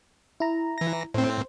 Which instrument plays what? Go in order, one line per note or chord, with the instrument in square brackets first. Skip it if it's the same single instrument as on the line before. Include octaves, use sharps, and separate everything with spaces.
[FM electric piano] E4 A#5
[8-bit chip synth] E3 A#6
[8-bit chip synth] A2 C4 [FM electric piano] C5